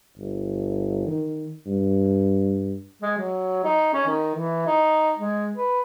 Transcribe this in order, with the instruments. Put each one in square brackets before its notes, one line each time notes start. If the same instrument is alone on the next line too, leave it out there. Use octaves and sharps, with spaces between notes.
[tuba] G1
D#3
G2
[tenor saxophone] G#3
F#3
D#4
C#4
D#3
E3
D#4
G#3
B4